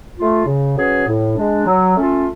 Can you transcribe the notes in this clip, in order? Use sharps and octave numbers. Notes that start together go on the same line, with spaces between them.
A3 F4
C#3
F#3 C#4 G#4 B4
A2
G#3 D4
F#3
A3 C#4 F4 A4